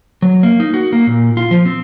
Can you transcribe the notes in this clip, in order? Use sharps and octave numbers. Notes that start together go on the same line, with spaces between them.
F#3
A#3
D#4
F#4
A#3
A#2
F4
F3
C4